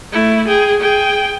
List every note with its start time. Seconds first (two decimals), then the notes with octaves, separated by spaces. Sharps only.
0.12 A3 E4
0.47 G#4 G5
0.79 G#4 G5